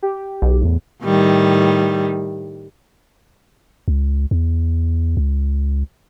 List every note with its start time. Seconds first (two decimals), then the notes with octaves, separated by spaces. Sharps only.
0.03 G4
0.42 B1
0.61 E2 A2
1.04 A2 D#3 G3
3.88 C#2
4.31 E2
5.17 C#2